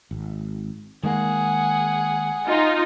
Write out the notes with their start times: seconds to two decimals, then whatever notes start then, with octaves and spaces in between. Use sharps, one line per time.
0.11 G#1
1.03 D#3 G#3 A#3 G#4 F#5
2.47 D#4 F4